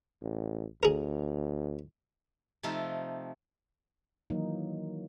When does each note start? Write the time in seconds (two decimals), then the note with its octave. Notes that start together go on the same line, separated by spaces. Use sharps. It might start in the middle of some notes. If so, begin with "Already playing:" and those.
0.22 A1
0.83 D2 G#4 A#4
2.63 C3 F3 A3 D#4 F4 A4
4.30 D#3 E3 F#3 A#3 D#4